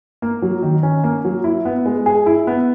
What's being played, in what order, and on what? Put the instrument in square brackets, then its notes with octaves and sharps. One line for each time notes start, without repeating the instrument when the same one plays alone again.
[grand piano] A#3
F#3
D#3
C#4
A#3
F#3
E4
B3
G#3
G#4
E4
B3